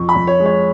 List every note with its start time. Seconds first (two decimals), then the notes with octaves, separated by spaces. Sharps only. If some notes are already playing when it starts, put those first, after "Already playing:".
Already playing: F2 C#6
0.09 B5
0.15 F2
0.27 C#5
0.40 G#3
0.46 C#5